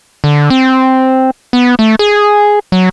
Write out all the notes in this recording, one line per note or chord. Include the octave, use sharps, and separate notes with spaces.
D3
C4
B3
A3
G#4
F#3